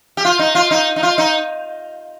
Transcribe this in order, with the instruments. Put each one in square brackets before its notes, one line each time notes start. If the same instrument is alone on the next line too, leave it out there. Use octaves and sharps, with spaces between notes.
[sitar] G4
F4
D#4
F4
D#4
D#4
F4
D#4